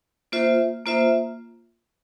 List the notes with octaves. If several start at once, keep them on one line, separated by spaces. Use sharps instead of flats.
A#3 F4 C5 E5
A#3 F4 C5 E5